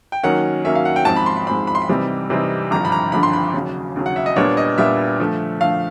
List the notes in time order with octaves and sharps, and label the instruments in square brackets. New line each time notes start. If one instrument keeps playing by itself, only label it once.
[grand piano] G5
[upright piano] D#3 F#3 A#3 C#4 [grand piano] F#5
[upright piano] D#3 F#3 A#3 C#4 [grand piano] E5
[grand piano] F5
F#5
G5
[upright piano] G#2 F3 G#3 C4 [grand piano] A5
[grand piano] B5
C6
B5
[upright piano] G#2 F3 G#3 C4 [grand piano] B5
[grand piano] B5
C6
B5
[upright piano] C3 E3 G3 C4 D#4
C3 E3 G3 C4 D#4
[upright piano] G#1 G2 D3 F3 [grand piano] A#5
[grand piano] B5
A#5
[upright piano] G#1 G2 D3 F3 [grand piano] B5
[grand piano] C6
B5
[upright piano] D#2 C#3 F#3
D#2 C#3 F#3
[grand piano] F#5
E5
D#5
[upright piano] A#2 G3 B3 D4 [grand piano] C#5
[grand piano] D#5
[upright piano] A#2 G3 B3 D4 [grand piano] E5
[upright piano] D3 F3 A3
[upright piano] D3 F3 A3 [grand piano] F5